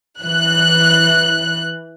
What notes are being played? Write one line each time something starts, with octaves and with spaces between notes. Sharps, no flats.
E3 F#6